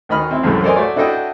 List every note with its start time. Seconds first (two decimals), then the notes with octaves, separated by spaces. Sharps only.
0.09 D2 D#3 D#5 B5 F6
0.31 C4 E4
0.43 C2 F#2 A2 E3 G#3 A3
0.63 A4 A#4 C5 D5 D#5 G#5
0.76 A3 F#4 C#5 D5
0.96 D4 E4 F#4 A4 D#5 G5